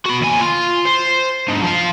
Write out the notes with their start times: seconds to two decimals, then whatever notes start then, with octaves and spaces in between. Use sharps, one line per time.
0.05 F#4 B5
0.21 D#2 G#5
0.41 F4
0.85 C5
1.48 G#2 D3
1.62 F3 F5